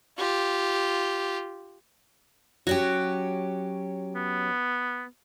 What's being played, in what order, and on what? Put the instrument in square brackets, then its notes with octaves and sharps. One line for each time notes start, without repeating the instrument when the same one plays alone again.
[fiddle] F4 G4
[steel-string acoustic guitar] F#3 C#4 G4 [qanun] F#4
[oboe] B3